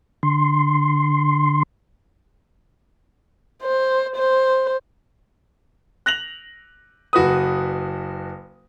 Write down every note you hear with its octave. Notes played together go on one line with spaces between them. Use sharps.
D3 C6
C5
C5
F#6 A#6 F7 F#7
F#1 F#4 B4 D#6